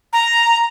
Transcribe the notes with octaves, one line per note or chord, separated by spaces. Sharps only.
A#5